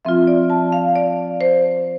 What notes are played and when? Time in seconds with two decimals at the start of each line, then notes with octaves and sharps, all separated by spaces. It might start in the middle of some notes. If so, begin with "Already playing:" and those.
0.05 F3 C4 F4 E5
0.27 D5
0.50 A5
0.72 F5
0.96 D5
1.41 C5